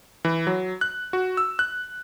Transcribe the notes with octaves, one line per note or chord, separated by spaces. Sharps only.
E3
F#3
F#6
F#4
E6
F#6